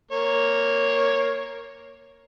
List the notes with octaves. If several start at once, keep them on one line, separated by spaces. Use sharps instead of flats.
A#3 C#5